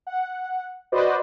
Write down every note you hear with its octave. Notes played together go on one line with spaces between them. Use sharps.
F#5
F#4 B4 C5 D5 D#5